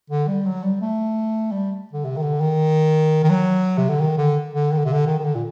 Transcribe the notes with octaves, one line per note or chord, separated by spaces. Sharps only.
D3
G3
F#3
G3
A3
G3
D3
C3
D#3
D3
D#3
D#3
F#3
C3
D3
D#3
D3
D3
D#3
D3
C3
D3
D#3
D#3
D3
A#2